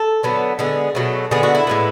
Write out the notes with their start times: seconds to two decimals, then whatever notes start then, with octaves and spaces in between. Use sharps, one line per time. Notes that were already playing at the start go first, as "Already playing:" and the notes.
Already playing: A4
0.23 D3 F#3 B3
0.59 D3 G#3 B3 G#4
0.95 B2 F#3 A3
1.31 D3 G#3 B3 G#4
1.43 F#4
1.55 E4
1.67 A2 G#3 B3